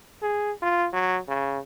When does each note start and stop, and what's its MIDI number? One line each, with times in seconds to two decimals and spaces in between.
0.22 0.51 68
0.63 0.87 65
0.93 1.19 54
1.28 1.59 49